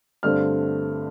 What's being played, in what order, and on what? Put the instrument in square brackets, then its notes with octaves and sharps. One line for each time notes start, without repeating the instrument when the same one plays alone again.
[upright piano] G2 D3 A3 C4 F6